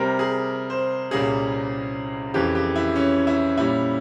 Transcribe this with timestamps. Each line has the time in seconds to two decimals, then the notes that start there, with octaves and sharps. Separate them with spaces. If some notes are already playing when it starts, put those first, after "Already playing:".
Already playing: C3 G3 C4 A#4
0.19 G#4
0.70 C5
1.11 C2 A#2 G3 A#3 C#4 G#4
2.34 F2 C#3 E3 G4
2.55 G4
2.76 E4
2.96 C#4
3.27 E4
3.57 A#2 G3 C#4 E4